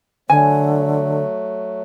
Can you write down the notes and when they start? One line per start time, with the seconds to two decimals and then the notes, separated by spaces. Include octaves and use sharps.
0.30 D3 F#3 A3 G#5